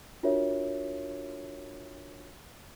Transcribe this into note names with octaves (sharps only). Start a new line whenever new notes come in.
D4 F4 F#4 A#4 C#5 E5